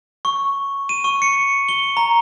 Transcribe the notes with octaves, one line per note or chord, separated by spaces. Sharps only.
C#6
D#7
C#6
C#7
G7
A#5